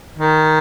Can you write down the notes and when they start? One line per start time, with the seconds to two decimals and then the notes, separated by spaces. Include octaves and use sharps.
0.18 D#3